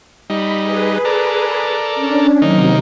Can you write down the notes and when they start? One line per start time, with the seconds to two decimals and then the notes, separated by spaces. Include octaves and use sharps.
0.30 G3 D#4 B5
0.62 G#4 B4
1.05 A4 A#4 D5
1.95 C#4 D4
2.42 C3 D#3 F#3 A#3 D#4